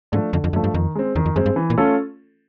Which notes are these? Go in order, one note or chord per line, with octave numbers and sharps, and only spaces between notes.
G#2 F3 A3 D4
F2 D3
F2
F#2 F3 A3 D4
G2
F2 D#3
G#3 C4
E2 D#3
F2
F#2 G#3 C4
G2
E3
A#2
A3 C#4 F4 A4